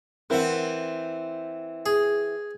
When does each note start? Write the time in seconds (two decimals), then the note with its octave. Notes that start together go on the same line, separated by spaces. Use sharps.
0.30 E3 C4 E4 A#4 F#5
1.86 G#4